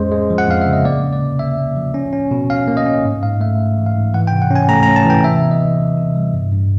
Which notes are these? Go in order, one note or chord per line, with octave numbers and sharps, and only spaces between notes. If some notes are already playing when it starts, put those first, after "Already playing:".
Already playing: F2 G#3 C#4 C5
G#3
F3
F#5
F2 F5
C#3 E5
D#5
A#3 D5
C#4
D5
C3
A#3 E5
A#3
F3
C#4
C#4
B2
C#4 F5
A#3
D#5
C#4
G#2
G#2 F5
A3 E5
G#2
E3
F5
G#2
E3 F#5
G5
C3
F#5
C#4 G#5
A3 A#5
A#5
C#4
A5
E3 G5
C3 E5
B3
D#5
E3
E3
C3
G3
G2
G2